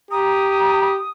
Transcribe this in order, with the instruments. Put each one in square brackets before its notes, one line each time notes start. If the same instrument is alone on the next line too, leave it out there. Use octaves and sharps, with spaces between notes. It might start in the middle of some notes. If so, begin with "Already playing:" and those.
[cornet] G4 [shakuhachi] A#5 [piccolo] D#6